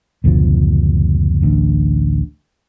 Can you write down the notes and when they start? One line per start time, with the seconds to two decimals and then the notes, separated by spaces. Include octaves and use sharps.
0.24 F#1 D2 B2 F3
1.42 A1 D2